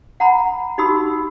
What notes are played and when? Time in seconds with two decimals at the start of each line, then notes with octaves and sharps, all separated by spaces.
0.20 F#5 A#5 B5
0.78 D#4 F#4 G4 B5 D#6 E6